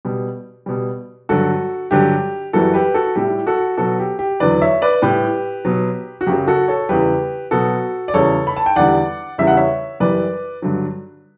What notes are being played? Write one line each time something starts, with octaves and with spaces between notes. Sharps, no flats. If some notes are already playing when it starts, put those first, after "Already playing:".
B2 G3
B2 G3
G2 D3 F#3 F#4 A4
G2 D3 F#3 G4
F#2 E3 G3 F#4 A4
G4 B4
F#4 A4
A2 G3 G4
F#4 A4
B2 F#3 F#4 A4
G4
G4
E2 D3 F#3 B4 D5
C#5 E5
B4 D5
A2 G3 G4 B4
B2 F#3
F#4
F#2 C#3 F#3 G4
F#4 A4
A4 C#5
E2 C#3 G3 G4 B4
B2 F#3 F#4 A4
D5
E2 C#3 G3 A4 C#5
B5
A5
G5
E2 D3 G3 D5 F#5
E2 C#3 G3 E5
F#5
C#5 E5
F#2 E3 G3 B4 D5
G2 D3 F#3